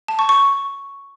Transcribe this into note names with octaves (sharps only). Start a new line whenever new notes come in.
A5
C#6
C#6